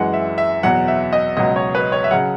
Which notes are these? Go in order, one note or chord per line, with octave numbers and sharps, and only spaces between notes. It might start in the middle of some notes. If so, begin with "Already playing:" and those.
Already playing: F#2 E3 G#3 F#5
E5
E5
E2 B2 F#3 F#5
E5
D#5
C#2 B2 F#3 D#5
C#5
B4
C#5
E5
C#3 F#3 F#5